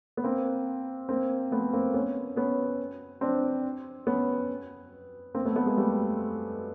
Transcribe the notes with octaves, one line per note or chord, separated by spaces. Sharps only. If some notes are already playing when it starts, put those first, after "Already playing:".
B3
A#3 C4
A#3 C4
A3 B3
A#3 C4
B3 C#4
B3 C#4
C4 D4
B3 C#4
A#3 C4
A3 B3
A3 B3
G#3 A#3
G3 A3